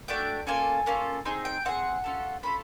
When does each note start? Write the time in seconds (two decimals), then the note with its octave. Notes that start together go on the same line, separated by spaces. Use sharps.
0.08 A3 D4 F#4 G5
0.47 A#3 C#4 F4 A4 G#5
0.86 A#3 C#4 F4 A4
1.25 C4 D#4 G#4
1.45 G5
1.65 C4 D#4 G#4 F#5
2.04 C#4 F4 A4
2.43 C#4 F4 A4 B5